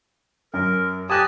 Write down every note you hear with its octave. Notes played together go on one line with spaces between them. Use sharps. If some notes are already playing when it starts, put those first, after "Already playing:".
F#2 A#4
G4 G#5 A5 D#6 F#6 A#6